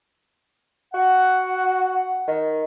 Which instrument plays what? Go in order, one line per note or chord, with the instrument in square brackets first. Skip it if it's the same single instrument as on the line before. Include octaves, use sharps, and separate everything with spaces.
[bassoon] F#4 [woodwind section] F#5
[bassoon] D#3